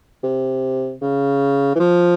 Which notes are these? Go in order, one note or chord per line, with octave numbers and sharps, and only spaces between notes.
C3
C#3
E3
F3